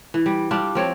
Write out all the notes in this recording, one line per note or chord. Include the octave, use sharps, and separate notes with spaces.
E3
G3
G3 D4 F4
F3 C4 C#5